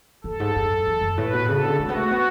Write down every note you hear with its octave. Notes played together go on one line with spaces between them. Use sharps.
F#2 A4
G#2
F#2
E2
F#2
A2 B4
B2
C#3 A4
D3
G#3 F#4
B3
A3
B3